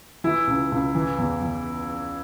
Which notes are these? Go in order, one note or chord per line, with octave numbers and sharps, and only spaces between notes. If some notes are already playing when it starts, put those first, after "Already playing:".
E3 E4
C#2
C#2
E3
E2
E2